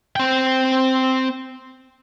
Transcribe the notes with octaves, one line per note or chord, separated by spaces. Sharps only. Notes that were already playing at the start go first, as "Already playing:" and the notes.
C4 G5